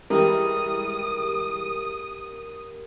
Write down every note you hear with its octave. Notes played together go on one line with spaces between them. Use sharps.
E3 G3 G#3 G4 A#4 D#6